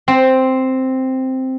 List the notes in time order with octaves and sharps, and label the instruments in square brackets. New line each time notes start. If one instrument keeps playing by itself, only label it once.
[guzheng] C4